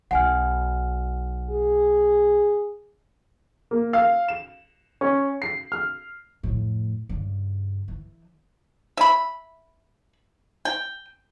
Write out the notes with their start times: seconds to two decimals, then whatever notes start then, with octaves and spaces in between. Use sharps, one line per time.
0.11 B1 F#5 G#5 F6
1.50 G#4
3.71 A#3
3.93 F5
4.28 E7
5.01 C#4
5.42 C7
5.72 F6
6.43 F2 A2
7.09 G2 C#3
7.88 E3
8.97 E5 B5
10.65 G5